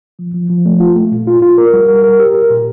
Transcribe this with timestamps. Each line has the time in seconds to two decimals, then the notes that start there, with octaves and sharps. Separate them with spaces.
0.19 F3
0.34 F3
0.50 F3
0.66 A3
0.80 F4
0.96 A3
1.11 A#2
1.27 F4
1.42 F4
1.58 A#4
1.73 G3
1.88 A#4
2.04 A#4
2.19 G4
2.35 A#4
2.50 A#2